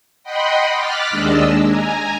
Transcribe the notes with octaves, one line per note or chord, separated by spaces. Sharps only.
D#5 F#5 G5 B5 C6
D6 F6 F#6 A6 B6
D#2 G#3 D4 D#5 E6
G#5 A#5